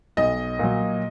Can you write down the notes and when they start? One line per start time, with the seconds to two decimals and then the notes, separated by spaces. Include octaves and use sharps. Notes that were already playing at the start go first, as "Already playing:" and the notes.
0.17 B1 D#5
0.59 A#2 F#3